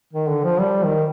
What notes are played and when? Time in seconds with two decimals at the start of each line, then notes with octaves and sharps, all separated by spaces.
0.13 D#3
0.29 D3
0.44 F3
0.60 G3
0.83 D#3